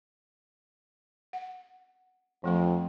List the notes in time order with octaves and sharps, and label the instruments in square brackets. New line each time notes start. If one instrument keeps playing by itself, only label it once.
[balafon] F#5
[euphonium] F2 [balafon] F3 A3 F4